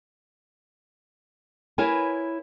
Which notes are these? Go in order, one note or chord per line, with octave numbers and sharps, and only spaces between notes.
E4 A#4 B4 C#5 G#5